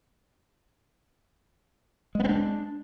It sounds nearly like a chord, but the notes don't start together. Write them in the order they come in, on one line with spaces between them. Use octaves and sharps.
G#3 B3 C4 D4